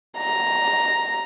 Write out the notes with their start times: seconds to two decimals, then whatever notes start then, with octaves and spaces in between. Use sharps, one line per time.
0.19 A#5